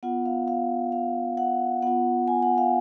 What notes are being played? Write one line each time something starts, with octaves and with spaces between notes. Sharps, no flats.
B3 F4 F#5
F5
F5
F5
F#5
B3 F4 F#5
G#5
F#5
F5